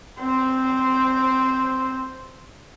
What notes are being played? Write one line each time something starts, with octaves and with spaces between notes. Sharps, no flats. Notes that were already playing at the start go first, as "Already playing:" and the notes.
C4 C5